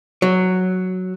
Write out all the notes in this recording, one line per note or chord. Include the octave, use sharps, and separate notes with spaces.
F#3